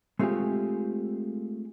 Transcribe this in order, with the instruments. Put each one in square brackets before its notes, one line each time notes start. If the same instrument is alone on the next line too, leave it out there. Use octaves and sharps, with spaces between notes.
[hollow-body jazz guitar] G#3 A3 C4 F4 G4 G#4